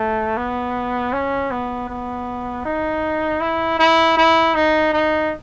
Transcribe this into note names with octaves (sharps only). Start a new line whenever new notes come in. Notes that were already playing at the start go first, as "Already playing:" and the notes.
Already playing: A3
B3
C#4
B3
B3
D#4
E4
E4
E4
D#4
D#4